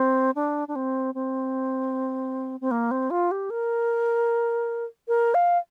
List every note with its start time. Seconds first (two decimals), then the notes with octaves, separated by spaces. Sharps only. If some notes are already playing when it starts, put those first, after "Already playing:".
Already playing: C4
0.35 D4
0.68 D4
0.76 C4
1.15 C4
2.61 C4
2.71 A#3
2.91 C4
3.10 F4
3.31 G4
3.50 A#4
5.08 A#4
5.34 F5